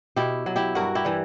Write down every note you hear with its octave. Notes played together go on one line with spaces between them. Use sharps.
B2 E4 G4
F#3
E4 G4
G2 F#4 A#4
E4 G4
E3 G3